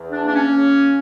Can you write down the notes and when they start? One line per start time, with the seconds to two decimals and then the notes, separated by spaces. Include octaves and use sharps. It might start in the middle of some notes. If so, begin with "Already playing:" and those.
Already playing: E2
0.12 D4
0.24 A#3 D4
0.35 C#4
0.57 C#3